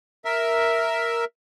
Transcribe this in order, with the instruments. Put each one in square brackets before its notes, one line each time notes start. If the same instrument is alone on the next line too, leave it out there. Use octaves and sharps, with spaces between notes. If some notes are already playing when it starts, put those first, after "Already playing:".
[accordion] A#4 E5